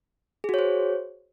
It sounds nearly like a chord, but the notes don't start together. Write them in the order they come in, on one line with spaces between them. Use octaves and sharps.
G#4 F#4 C#5 C5